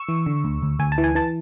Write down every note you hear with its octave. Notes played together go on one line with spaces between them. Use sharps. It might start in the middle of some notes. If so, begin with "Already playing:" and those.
Already playing: C#6 E6
E3
D3
D2
D2
D2 G#5
A5
E3
G#5
E3 A5